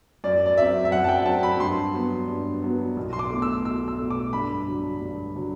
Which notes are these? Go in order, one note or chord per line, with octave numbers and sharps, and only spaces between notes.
F#2 D5
D5
F#3 C4 E5
E5
F#2 F#5
A5
G5
F#3 C4 A5
B5
G2 C6
F#3 B3
G2
F#3 B3
B1
C6
D6
B2 A3
E6
B1 E6
E6
B2 A3
D6
G2 B5
D3 F#3
G2
D3 F#3